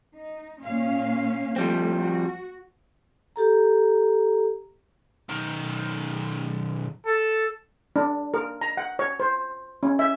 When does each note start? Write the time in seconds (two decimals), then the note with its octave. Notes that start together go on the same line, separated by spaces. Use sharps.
0.14 D#4
0.63 A#2 C#4 F5
1.56 F3 G3 A3 C4
2.00 F#4
3.36 G4 A4 A#5
5.29 B1 D#3
7.06 A4
7.96 D4
8.34 A#4
8.61 A#5
8.77 F#5
8.99 C#5
9.20 C5
9.83 C#4
9.99 E5